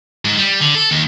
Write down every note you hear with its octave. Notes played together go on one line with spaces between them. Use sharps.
G#2
G3
D3
A4
D#2